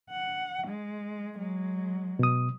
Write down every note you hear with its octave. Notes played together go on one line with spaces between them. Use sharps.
F#5
G#3
F#3 G#3
B2 D#6